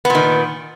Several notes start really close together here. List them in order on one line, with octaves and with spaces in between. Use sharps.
B3 A#2 D#3